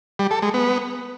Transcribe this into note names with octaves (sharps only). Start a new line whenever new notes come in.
G3
A4
G#3
B3